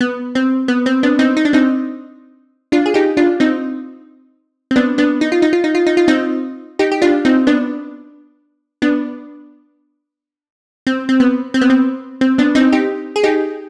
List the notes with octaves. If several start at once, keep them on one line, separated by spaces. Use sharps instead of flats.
B3
C4
B3
C4
B3 D4
C4 D#4
D#4
D4
C4 D#4
D4 F4
G#4
D#4 G4
D4 F4
C4 D#4
C4
B3 D4
B3 D4
D#4
F4
D#4
F4
D#4
F4
D#4
F4
C4 D#4
D#4 G4
G4
D4 F4
C4 D#4
B3 D4
B3 D4
C4
C4
B3
C4
B3
C4
C4
B3 D4
C4 D#4
D#4 G4
G#4
D#4 G4